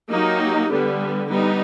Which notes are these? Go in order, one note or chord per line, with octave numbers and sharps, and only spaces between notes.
F#3 A#3 D#4 G4
D3 G3 B3
G3 B3 D#4